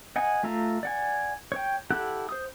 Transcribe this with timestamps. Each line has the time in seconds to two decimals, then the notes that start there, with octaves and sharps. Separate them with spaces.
0.16 D#5 F#5 G#5
0.43 A3 F4 E5 A#5
0.83 D5 F#5 G#5
1.52 C#5 G5
1.90 E4 G4 A4 F#5 F#6
2.29 C5 D#6